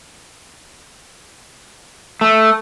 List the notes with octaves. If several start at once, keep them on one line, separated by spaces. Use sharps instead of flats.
A3